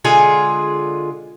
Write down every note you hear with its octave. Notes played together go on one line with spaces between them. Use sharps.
D3 G#3 F4 G#4